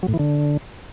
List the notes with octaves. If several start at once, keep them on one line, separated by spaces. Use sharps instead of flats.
F#3
A2
E3
D3